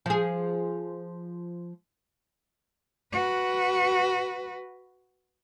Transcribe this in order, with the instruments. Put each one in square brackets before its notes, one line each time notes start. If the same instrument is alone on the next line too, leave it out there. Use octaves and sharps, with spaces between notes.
[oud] F3 G#4
[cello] F#4 B4